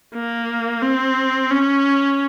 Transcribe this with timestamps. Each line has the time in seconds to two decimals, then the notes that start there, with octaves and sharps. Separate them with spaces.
0.15 A#3
0.82 C4
1.51 C#4